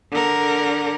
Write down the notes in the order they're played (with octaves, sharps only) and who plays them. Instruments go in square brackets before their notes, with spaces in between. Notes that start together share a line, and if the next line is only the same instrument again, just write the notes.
[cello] D3 A#4